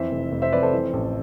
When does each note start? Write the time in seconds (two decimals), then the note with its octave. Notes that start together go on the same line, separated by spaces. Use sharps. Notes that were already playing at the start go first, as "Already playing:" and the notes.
Already playing: F2 E3 C5 E5
0.12 F1
0.32 F1
0.42 C5 E5
0.52 F2 B4 D5
0.63 A4 C5
0.73 E3
0.93 A1